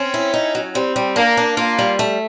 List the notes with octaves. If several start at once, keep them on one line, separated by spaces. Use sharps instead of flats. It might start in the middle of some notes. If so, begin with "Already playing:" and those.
Already playing: C4 C#4
E4
D#4
F#3
G3 C4
G3
A#3 D4
D4
A#3 F4
G3
A3